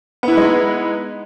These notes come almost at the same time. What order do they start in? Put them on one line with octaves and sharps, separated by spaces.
B3 E4 B4 G#3 D#4